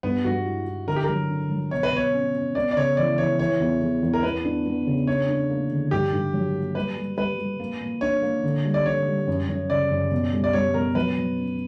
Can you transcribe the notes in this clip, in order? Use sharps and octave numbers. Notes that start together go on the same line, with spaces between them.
G2 B3
G2 F#4
E4
E4
D3 A#4
G4
F#3 A#4
D3
F#3
B2 C#5
B4
B2 C#5
C#4
C#4
B3 D5
D5
C#3 C#5
E3 D5
E3 C#5
E3 C#5
E2
E2
E2
A#4
B3 B4
D4
B3
C#3
D4 C#5
D4
A#3
D3
G2 G4
G2
F#3
A#3
G3 B4
G3
G3 B4
G3
A#3
A#2
D4 C#5
A#3
D3
G3
D5
D3 C#5
G3
F#2
F#2
C#3 D5
F#2
B2
G3
D5
G3 C#5
B2 A#4
F#3 B4
F#3
C#4